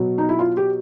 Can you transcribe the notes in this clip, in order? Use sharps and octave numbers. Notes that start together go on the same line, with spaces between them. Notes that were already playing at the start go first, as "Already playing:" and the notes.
Already playing: B2 F#3
D#4
E4
F4
G4